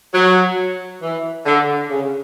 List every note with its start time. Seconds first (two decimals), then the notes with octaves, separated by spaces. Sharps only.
0.14 F#3
1.02 E3
1.46 D3
1.90 C#3